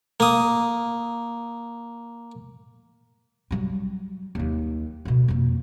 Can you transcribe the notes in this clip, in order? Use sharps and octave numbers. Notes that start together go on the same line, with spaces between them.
A#3 D#6
F#3 G3
D#2 D#3
D2 B2
F2 A#3